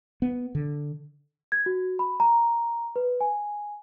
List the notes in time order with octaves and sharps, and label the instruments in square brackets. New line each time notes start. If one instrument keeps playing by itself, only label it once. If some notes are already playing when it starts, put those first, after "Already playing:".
[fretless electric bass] B3
D3
[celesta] G#6
F#4
B5
A#5
B4
G#5